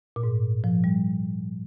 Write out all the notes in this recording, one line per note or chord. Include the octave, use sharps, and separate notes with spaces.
A#2
G#2
F3
G3